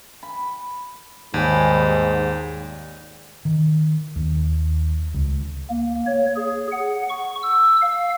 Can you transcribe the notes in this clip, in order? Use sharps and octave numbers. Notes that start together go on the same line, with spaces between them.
B5
D#2 G#2 G3 G#5
D#3
D#2
C#2
A#3
C#5
G#4
F#5
C#6
E6
F5